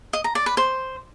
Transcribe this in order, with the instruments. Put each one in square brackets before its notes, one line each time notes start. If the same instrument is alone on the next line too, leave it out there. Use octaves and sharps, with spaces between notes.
[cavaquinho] D#5
A#5
D5
B4
C5